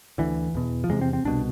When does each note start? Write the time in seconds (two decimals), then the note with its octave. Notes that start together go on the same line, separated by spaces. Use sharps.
0.18 D2 D3 E3
0.55 E2 B2
0.84 F3
0.89 E2 C3 G#3
1.01 C4
1.13 C4
1.25 C2 B2 D4